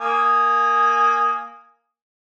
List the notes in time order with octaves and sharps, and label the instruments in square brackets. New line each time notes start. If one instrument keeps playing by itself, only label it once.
[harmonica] A#3 G#5 D#6